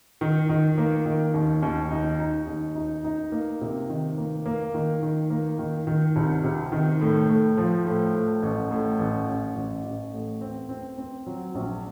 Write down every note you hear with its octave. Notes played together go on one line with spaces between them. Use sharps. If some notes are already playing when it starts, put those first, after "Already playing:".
D#3
D#3
A#3
D#3
D#2
D#2
D#4
D#4
D#2
D#4
D#4
A#3
C3
D#3
A#3
A#3
D#3
D#3
A#3
D#3
D#3
C2
C3
D#3
A2
A2
F3
A2
A2
A1
A2
A1
A1
A1
A1
A2
C4
C4
C4
F#3
A#1